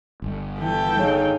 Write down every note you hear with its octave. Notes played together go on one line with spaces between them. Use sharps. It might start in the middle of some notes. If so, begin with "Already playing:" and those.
G1
E3 A4 G5
C#3 D#4